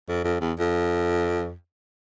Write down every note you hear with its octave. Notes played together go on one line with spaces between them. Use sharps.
F2
F2
E2
F2